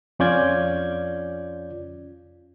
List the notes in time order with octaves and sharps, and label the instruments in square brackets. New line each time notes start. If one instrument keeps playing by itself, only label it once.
[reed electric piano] F2 C#4 F4 D5 G6 G#6